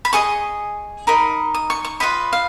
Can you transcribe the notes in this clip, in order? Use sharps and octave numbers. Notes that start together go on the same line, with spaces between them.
B5
G#4 D#5 C#6
D#4 A#4 D#5 B5
D#6
C#6
C#6
F4 B4 D#5 B5
F5